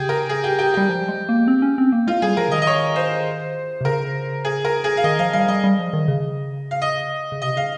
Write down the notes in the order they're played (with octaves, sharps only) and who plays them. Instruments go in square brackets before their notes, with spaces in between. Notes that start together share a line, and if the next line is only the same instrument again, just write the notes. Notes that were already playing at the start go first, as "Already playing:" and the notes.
Already playing: [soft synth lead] C#3 [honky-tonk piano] G4 G#4
[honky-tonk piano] A#4
G#4
G4
G4
[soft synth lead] G3 [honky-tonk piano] G4
[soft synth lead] F3
G#3
A#3
C4
C#4
C4
A#3
[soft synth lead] G#3 [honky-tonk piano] F4
[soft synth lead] G3 [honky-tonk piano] G#4
[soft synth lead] F3 [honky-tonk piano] A#4
[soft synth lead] C#3
[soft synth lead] D#3 [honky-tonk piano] D#5
[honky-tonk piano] D#5
C#5
C5
[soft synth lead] C3
[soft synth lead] C#3 [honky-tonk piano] A#4
[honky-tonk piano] G#4
A#4
G#4
F5
[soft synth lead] D#3 [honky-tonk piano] D#5
[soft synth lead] F3 [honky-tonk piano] F5
[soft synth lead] G3 [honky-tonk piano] F5
[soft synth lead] G3 [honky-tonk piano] D#5
[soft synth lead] G3
F3
D#3
C#3
[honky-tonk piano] F5
D#5
[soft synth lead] C#3
[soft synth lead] C3 [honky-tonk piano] D#5
[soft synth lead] C#3 [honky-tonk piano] F5